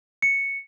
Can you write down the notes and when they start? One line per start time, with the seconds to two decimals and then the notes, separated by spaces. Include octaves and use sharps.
0.22 C#7